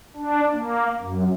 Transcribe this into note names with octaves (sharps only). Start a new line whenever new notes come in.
D4
A#3
F#2